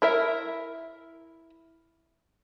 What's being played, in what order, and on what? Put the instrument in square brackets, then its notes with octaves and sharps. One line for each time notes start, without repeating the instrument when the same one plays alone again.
[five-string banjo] E4 A#4 E5